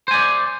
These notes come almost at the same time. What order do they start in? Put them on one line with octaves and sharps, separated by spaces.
C5 G#5 D5